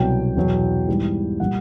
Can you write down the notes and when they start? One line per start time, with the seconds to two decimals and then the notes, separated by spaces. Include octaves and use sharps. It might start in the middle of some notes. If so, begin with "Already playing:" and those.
Already playing: C2 B2 F#3 G5
0.36 E2 B2 F#3
0.88 G#2 E3 G3
1.40 A#2 G3 F#5